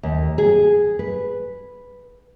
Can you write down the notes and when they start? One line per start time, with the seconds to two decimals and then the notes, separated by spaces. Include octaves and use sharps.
0.03 D#2
0.38 G#4
0.99 B4